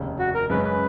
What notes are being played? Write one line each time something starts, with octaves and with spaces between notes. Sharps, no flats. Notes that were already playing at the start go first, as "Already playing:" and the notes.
Already playing: F1 D#2 C#3
F#4
A#4
F#2 C#3 G#3 C#4 B4
B4